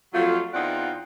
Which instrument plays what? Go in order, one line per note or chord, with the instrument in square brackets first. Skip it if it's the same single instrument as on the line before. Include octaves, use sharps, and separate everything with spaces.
[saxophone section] F2 F#3 A3 F4
E2 C4 D#4 F4 D5 F#5